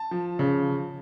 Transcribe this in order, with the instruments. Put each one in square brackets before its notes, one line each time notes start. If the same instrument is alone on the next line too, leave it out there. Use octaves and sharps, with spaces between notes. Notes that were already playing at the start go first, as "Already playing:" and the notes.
Already playing: [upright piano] A5
F3
C#3